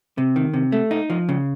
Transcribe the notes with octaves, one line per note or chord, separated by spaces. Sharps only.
C3
D#3
C3
A3
D#4
F3
C#3